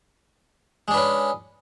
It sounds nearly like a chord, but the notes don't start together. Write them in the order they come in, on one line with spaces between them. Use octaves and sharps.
G#3 D4 B4 C#4